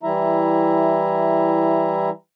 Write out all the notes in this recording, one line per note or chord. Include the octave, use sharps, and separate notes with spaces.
E3 G3 E4 E5 A#5